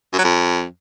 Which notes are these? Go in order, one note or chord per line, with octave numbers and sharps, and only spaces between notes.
F#2
F#3
F2